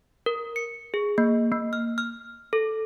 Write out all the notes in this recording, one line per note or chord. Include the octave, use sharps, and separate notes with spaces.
A#4
C#7
G#4
A#3
A#3
F6
F6
A4